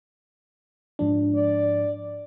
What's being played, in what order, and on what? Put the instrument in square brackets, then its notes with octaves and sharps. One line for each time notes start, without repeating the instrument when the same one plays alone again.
[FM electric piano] G#2 F3 D4
[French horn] D5